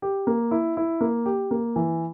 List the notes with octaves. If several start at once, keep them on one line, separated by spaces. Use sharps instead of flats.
G4
A#3
E4
E4
A#3
G4
A#3
E3